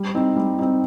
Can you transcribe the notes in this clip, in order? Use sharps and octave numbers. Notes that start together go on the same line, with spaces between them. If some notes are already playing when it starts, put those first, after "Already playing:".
Already playing: G3
C4 D#4
G3
C4 D#4